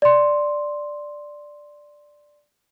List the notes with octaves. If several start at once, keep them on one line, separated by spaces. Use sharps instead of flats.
D5 C6